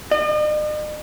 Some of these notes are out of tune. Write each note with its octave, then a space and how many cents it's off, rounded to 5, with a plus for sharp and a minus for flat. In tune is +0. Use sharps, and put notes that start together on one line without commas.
D#5 -45